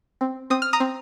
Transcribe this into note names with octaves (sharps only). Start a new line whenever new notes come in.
C4
C4 D#6
F6
A#5 D#6
C4